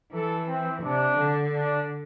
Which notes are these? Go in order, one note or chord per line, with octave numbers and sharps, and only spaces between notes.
E3 A4
C4
C3 D4
D3
D4